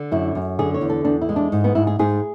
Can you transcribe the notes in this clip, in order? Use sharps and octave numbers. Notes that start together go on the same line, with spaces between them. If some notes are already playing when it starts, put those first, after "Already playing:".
Already playing: D3
F#2 E4
F#2
D3 G#4
C#5
E2
A4
E2 D4
E4
G#3
D4
G#2
B3
G#2 E4
G#4
G#2 G#4